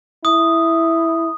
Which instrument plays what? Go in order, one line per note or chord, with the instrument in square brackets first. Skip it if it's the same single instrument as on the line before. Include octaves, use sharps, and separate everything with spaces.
[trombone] E4 [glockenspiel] D#6